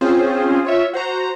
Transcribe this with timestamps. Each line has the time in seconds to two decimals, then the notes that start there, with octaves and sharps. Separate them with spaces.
0.01 C4 C#4 F4 G#4 C5
0.65 F4 C#5 E5
0.93 F#4 C5 A#5